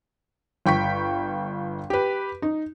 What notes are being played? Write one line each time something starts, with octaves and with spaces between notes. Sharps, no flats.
G1 G5 C#6 B6
G4 B4
D#4